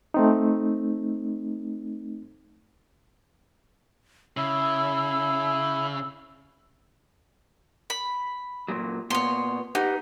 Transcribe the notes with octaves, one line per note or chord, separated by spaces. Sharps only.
A3 C4 D#4
C#3 E4 E6
B5
F#2 A#2 F#3
A#2 B3 C#5 C6
D#4 G4 B4 F#5